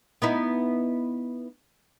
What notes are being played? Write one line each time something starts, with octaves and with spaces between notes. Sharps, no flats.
B3 D#4 E4